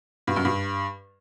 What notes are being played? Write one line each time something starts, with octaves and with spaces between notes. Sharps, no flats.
G2
F#2
G2